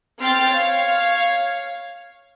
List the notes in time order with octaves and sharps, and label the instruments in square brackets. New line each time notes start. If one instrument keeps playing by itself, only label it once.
[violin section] C4 G5 C6 F6 A6 C7
C#5 F5